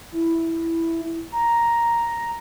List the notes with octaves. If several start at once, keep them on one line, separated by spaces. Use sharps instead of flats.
E4
A#5